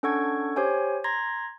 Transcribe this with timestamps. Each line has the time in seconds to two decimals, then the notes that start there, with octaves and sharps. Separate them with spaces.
0.03 C#4 D4 A4 F#5 C#6 G#6
0.56 G4 C5 C#5 G#5
1.04 A#5 C6 G#6 A#6